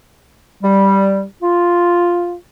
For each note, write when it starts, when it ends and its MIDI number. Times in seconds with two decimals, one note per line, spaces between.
0.62 1.23 55
1.43 2.34 65